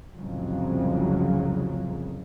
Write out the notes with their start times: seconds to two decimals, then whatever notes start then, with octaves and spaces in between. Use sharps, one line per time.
0.15 C2 F2 A2 C#3 F#3